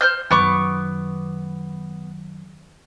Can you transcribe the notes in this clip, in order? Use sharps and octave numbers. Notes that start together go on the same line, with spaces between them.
C5 F6 G6
F#2 D#3 B3 C#6 D6